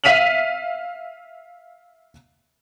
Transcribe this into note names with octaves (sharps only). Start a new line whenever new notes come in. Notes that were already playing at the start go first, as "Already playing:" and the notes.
E5 F5 B6 D#7 F7 F#7